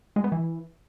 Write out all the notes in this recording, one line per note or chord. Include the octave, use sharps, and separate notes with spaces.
G#3
B3
E3